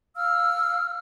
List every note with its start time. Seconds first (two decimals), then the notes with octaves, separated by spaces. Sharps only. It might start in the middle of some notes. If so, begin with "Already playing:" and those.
0.15 F5 E6 F6